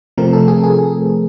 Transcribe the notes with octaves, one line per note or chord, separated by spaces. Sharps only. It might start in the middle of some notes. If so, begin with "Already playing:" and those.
C3 F3 A3 C4 A#4
A4
G#4
G#4